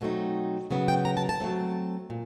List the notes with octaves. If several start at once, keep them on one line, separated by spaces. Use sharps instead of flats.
B2 F#3 A3 C4 D#4
C#3 F#3 B3 E4
G5
A#5
A5
A5
F#3 A3 C4
A#2